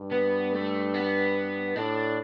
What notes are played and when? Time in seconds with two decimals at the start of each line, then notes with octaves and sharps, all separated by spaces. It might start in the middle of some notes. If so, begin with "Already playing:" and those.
Already playing: G2
0.11 B3
0.53 A3
0.94 B3
1.76 A2 D4